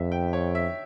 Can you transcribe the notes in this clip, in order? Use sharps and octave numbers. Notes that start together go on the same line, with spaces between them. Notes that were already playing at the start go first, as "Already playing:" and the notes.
Already playing: F2 E5
G5
C#5
E5